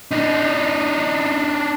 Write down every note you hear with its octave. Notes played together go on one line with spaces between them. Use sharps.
D4 D#4